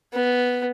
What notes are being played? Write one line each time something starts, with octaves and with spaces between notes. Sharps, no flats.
B3